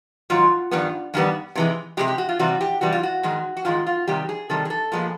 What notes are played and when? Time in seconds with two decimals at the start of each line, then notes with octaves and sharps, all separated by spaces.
0.30 G#2 D#3 F#3 F4
0.71 G2 D#3 G3 B3
1.14 G2 D#3 G3 B3
1.55 C3 E3 G#3
1.97 C3 E3 G#3 G4
2.08 G4
2.18 F#4
2.29 F4
2.39 C3 E3 G3 F#4
2.61 G4
2.81 C3 E3 G3 F#4
2.92 F4
3.03 F#4
3.23 G#2 D#3 G#3
3.57 F#4
3.65 G#2 D#3 G#3 F4
3.87 F4
4.07 C3 D#3 G3 G4
4.29 G#4
4.50 C3 D#3 G3 A4
4.65 G#4
4.70 A4
4.92 A#2 F3 G#3 B3